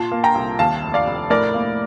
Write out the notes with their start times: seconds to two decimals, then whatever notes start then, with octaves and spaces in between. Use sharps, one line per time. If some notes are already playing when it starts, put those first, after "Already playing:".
Already playing: A#2 A5 C6
0.12 A#3
0.24 G5 A#5
0.35 C2
0.59 D#2 F5 A5
0.83 F1
0.94 D5 F5
1.07 F1
1.30 A2 A#4 D5
1.54 A#3